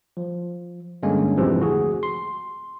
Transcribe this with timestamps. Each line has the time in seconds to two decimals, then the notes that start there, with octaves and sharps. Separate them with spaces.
0.17 F3
1.03 G2 D3 G#3 A#3 C#4
1.37 A1 F2 G#2 C3 E3 F3
1.60 D2 F#4 G#4
2.03 C6